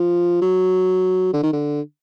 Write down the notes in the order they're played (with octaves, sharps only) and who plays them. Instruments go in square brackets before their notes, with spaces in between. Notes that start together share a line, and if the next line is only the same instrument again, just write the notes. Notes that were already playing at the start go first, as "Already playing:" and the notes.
Already playing: [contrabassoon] F3
F#3
D3
D#3
D3